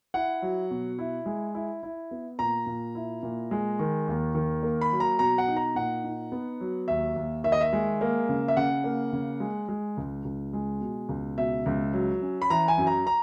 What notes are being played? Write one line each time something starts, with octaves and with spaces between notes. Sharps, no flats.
E4 F#5
F#3
B2
E4
G#3
E4
E4
B3
A#2 A#5
A#2
E4
A#2
G#3
D#3
D#2
D#3
A#3
B5
F#3
A#5
B2 A#5
F#5
D#4
A#5
A#2 F#5
D#4
B3
F#3
D#2 E5
D#2
D#3 E5
D#5
E5
G#3
A#3
C#3
E5
C#3 F#5
A#3
C#3
G#3
G#3
C#2
C#2
G#3
B2
C#2
B2 E5
C#2
F#3
C#4
B5
E3 A#5
G#5
F#2
A#5
A#5